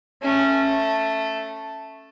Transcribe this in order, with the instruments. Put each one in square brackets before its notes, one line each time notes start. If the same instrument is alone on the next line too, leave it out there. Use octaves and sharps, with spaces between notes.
[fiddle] A3 [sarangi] C#4